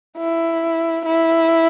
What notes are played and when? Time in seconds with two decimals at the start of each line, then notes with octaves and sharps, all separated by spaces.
0.18 E4
1.06 E4